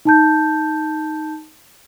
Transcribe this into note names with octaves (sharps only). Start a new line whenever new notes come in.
D#4 A5 G6